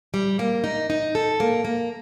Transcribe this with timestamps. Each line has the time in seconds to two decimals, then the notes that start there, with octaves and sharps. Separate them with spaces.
0.14 G3
0.39 A#3
0.64 D#4
0.90 D#4
1.15 A4
1.40 A#3
1.65 A#3